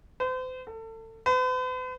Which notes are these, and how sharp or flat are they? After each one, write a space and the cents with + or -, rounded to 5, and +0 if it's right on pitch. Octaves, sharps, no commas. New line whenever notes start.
C5 -40
A4 +30
B4 +45